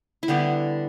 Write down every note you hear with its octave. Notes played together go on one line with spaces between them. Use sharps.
E4
D3 G3 B3 G4